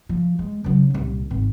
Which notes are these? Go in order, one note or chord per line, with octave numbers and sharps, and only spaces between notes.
F3
G#3
C#3 F#3
D#1 C2
G#1